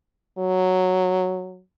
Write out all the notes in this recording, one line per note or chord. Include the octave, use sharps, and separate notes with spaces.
F#3